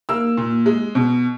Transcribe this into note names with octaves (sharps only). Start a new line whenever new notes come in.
A#3 E6
A#2
G#3
B2